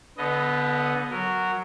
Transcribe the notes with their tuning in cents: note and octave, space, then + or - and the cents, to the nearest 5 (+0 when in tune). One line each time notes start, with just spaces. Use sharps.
D3 -30 B3 -5 D#5 +0
F#3 +0 A#4 -15